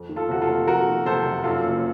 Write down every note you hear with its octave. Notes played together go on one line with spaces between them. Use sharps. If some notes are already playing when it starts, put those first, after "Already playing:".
Already playing: F2
D#3
F4 A4
C3 F#4
F4 A4
F1
F2 F#4 A#4
D#3
C3 A4 C5
F1
F#2 F4 A4
F#1